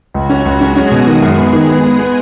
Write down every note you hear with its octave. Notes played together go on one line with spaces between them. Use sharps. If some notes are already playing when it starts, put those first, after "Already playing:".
C#2 F#3 F#4
C#4
C#2
G#3 C#4 G#4
C#4
B2
D#3 G#3 G#4
F#2
B3
D#3
B3
B3
B3